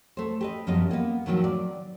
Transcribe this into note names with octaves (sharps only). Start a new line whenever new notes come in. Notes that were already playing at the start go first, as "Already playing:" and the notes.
A3 C5
G4 B4 D#5
F#2 F3 G3 B3 D#5
A#3 B3
A2 D#3 F3 F#3 C4
D5